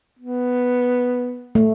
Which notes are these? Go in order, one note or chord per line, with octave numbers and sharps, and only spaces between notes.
B3
A3